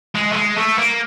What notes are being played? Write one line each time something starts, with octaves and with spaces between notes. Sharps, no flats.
G#3
A3
G#3
A3
A#3